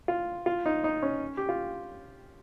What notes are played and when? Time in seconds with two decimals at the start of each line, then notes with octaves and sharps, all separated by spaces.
0.08 F4
0.46 F4
0.66 D#4
0.84 D#4
1.02 C#4
1.37 G4
1.49 F4